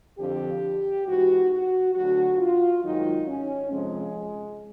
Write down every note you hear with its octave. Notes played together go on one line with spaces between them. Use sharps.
F2 D3 F3 G4
G#2 E3 F#4
F#4
D2 D3 F#3 F#4
F4
G#2 D#3 F#3 D#4
C#4
F2 C3 F3 G#3